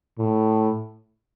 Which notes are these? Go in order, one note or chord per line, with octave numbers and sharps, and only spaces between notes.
A2